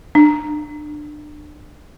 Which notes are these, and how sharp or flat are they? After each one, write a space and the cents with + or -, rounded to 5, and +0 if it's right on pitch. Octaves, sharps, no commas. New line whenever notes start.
D4 +30